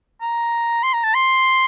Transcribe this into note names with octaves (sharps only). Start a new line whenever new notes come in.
A#5
C6
A#5
A5
C6